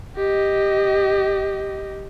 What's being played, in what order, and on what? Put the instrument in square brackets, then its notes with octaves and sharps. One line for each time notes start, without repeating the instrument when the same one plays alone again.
[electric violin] G4 D#5